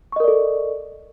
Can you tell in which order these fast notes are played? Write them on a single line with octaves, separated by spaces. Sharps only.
C#6 D#5 A#4 D5 A4